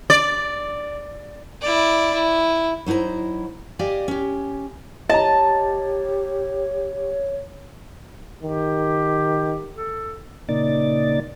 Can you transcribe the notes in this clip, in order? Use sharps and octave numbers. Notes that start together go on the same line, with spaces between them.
D5
E4 D5
E4
F#3 D#4 E4 C5 A#5
G4 D5 D#5 F5 G#5
C#4 G4
G4 C#5 D#5 A5 A#5
D#3 G4
A4
A#2 C#3 A#3 D#4 D5 A6